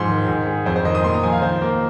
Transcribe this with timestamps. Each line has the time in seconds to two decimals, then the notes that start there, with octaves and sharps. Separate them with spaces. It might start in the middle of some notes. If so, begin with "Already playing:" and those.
Already playing: G#2 F3 C6
0.09 D#3
0.28 G#2
0.47 G#3
0.66 F2 C5
0.76 C5
0.85 D#3 D#5
0.95 D#6
1.04 A#2 C6
1.14 A#5
1.23 F3 G#5
1.33 F5
1.42 D#3 C5
1.62 A#3